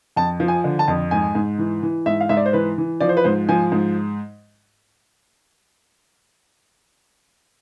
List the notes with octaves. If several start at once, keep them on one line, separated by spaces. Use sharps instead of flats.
F2 A5
F3
G#5
D3
A5
F2
G#2 G#5
G#2
E3
E3
G#2 E5
F5
G#2 E5
D5
C5
E3 B4
E3
F3 D5
C5
B4
G#2 C5
F3 G#5
G#2